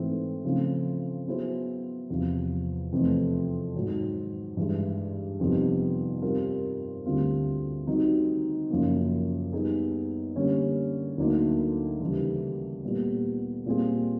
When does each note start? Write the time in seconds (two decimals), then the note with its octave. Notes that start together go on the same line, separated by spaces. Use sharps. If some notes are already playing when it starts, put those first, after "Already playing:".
Already playing: G#2 E3 A3 C4
0.45 C#3 F3 A3 C4
1.27 F#3 B3 E4 G#4 C5
2.10 E2 C3 F3
2.92 F2 C3 E3 A3 C4
3.75 G#2 D#3 F#3
4.57 G2 E3 G#3
5.40 F2 C3 D#3 G3 B3
6.22 G3 C4 F4 A#4
7.06 D2 D3 G3 C4 F4
7.87 D#3 G3 C4 D#4 F#4
8.70 F#2 C#3 F3 A#3
9.52 G3 B3 D#4 G#4
10.36 D3 G3 A#3 C#4
11.18 D2 D3 F#3 A#3 D#4
12.00 D#2 C#3 E3 G3
12.83 A#2 G3 B3
13.66 A#2 G3 C4 F4 G#4